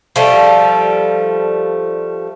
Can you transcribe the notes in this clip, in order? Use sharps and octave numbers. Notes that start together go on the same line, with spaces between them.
F3 G3 A3